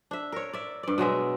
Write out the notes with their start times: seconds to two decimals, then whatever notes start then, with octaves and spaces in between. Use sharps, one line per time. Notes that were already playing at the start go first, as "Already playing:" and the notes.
0.11 D4 E5
0.32 A#4 C#5
0.53 D5 E5
0.83 G2 D5
0.98 B2 F#3 G#3 E5